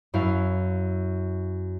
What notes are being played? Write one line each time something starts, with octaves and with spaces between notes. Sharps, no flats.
F#2 E4 F5